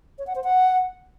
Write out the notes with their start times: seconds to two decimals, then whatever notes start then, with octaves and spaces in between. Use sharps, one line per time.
0.19 C#5
0.27 F#5
0.35 C5
0.44 F#5